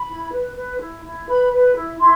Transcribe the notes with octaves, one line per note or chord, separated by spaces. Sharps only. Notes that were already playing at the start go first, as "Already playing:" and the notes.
Already playing: B5
E4
B4
B4
E4
E4
B4 B5
B4
E4
E4 C6